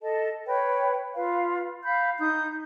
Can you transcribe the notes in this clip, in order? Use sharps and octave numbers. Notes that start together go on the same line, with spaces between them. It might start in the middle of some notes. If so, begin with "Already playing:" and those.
A4 D#5 A5
B4 C#5 G5
F4 B4 F5
F5 B5 G6
D#4 D#6 G6